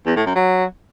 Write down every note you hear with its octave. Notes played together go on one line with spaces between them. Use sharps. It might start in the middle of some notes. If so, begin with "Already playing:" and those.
E2
A2
F#2
F#3